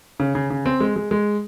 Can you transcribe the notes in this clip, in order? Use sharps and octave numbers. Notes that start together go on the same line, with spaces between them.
C#3
C#3
C#3
C4
G#3
G#3
G#3